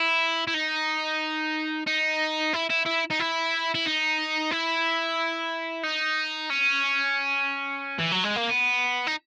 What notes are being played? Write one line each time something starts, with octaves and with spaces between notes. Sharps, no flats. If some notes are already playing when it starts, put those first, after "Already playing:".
Already playing: E4
E4
D#4
D#4
E4
E4
E4
D#4
E4
E4
D#4
E4
D#4
C#4
E3
F#3
G#3
A#3
B3
D#4